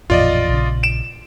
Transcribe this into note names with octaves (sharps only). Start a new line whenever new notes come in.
A1 F2 A#2 F4 D5 D#5
A#1 C#3
D7 E7